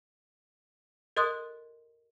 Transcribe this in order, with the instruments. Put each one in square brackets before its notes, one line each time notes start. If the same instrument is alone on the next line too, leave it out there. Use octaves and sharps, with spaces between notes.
[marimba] A4 A#4 D#5 C6 D#6 F#6